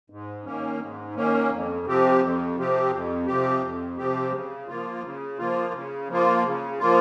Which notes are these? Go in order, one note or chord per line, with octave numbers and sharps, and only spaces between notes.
G#2
D#3 A#3 C#4
G#2
D#3 A#3 C#4
F2
C3 F3 C4 G4
F2
C3 F3 C4 G4
F2
C3 F3 C4 G4
F2
C3 F3 C4 G4
C#3
F3 A#3 F4
C#3
F3 A#3 F4
C#3
F3 A#3 F4
C#3
F3 A#3 F4